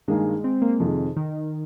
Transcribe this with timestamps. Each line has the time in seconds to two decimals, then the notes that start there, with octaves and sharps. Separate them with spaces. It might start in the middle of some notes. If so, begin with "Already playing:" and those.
0.08 G2 D#3 G#3 A#3 D#4 G#4
0.44 C4
0.62 A#3
0.80 F2 C3 D#3 F3 G#3
1.17 D#3